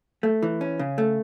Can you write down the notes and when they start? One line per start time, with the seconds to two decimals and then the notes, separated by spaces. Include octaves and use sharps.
0.23 A3
0.43 E3
0.61 C#4
0.79 C#3
0.98 A3